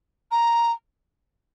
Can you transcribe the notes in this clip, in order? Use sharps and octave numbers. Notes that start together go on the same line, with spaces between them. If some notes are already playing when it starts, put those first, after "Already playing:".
A#5